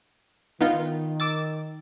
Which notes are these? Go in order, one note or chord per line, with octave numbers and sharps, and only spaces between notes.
D#3 B3 D#4 F4
D6 E6 A6